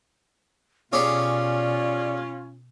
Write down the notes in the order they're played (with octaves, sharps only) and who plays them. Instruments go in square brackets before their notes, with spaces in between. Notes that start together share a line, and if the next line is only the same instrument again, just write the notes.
[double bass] B2 [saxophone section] C#4 F4 [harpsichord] G4 G#4 C#5 [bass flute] D5